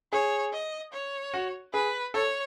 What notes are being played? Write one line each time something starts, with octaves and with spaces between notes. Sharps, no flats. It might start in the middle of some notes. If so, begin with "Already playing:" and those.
G#4 C#5
D#5
C#5
F#4
G#4 B4
A4 C#5